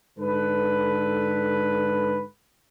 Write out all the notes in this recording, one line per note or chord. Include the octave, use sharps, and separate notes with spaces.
G#2 D3 A4 B4